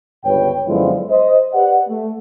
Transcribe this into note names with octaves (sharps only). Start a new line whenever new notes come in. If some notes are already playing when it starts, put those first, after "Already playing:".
G1 C#2 G2 B4 C#5 G5
F#2 D3 F3 G#3 B3 E4
C5 D#5
G4 B4 D5 F#5
A3